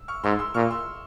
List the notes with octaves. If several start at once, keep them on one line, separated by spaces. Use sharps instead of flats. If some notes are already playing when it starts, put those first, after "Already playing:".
Already playing: E6
C#6 F6
G#2 C6 E6
C6 E6
A#2 C#6 F6
C6 E6